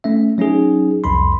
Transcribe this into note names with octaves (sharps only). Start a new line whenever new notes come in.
A3 C#4 E5
F#3 C#4 D#4 G#4
C2 F2 B5 C6